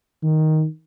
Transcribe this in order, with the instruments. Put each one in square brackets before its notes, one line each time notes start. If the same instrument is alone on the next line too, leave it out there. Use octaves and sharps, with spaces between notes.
[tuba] D#3